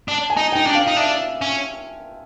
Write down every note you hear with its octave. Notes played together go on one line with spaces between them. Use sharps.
D4 A5
G#5
D#4
D#4 G5
D4
F5
D#4
D4 E5
C#4